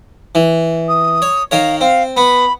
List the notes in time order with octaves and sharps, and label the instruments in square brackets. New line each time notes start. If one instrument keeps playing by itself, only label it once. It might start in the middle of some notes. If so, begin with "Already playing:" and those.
[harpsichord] E3
[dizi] D#6
[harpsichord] C#5
[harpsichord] D#3 A#4 C#5 [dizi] F5
[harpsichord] C4 [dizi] F5
[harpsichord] B3 [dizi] B5